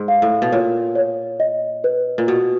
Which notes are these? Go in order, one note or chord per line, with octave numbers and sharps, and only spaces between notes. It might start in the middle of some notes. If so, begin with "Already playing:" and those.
Already playing: G#2
F5
A2
B2
A#2 C#5
C#5
D#5
B4
A#2
B2 F#4